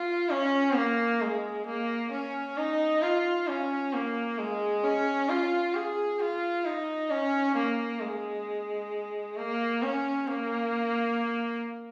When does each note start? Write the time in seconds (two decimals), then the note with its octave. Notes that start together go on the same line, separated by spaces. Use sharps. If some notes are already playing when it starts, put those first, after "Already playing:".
Already playing: F4
0.30 C#4
0.76 A#3
1.21 G#3
1.66 A#3
2.12 C#4
2.57 D#4
3.02 F4
3.48 C#4
3.93 A#3
4.38 G#3
4.83 C#4
5.29 F4
5.75 G#4
6.20 F4
6.65 D#4
7.10 C#4
7.56 A#3
8.01 G#3
9.37 A#3
9.82 C#4
10.28 A#3